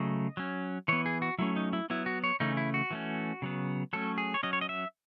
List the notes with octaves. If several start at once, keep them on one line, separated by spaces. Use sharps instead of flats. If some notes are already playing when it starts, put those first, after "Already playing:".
Already playing: C#3 F#3 A3 D#5
F#3 C#4
E3 B3 C#5
G#4
F#4
F#3 A3 C#4 E4
D#4
E4
F#3 B3 E4
F#4
C#5
C#3 E3 A3 C#4 D#4
E4
F#4
E3 A3 C#4
C#3 F#3 B3
F#3 A3 C#4 A4
G#4
C#5
F#3 C#4 D#5
C#5
D#5
E5